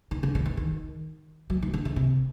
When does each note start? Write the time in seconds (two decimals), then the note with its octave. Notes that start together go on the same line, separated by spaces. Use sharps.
0.11 D#3
0.23 D3
0.35 D3
0.46 D#3
0.57 D#3
1.50 F#3
1.62 D#3
1.74 D3
1.85 D3
1.96 C3